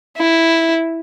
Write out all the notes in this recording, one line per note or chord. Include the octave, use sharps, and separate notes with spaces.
E4